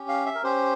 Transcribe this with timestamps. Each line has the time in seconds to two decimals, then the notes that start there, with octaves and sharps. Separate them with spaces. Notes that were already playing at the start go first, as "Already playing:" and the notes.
Already playing: C#4 G4
0.08 F5
0.26 E5
0.35 A#4
0.44 C#4 G4 C5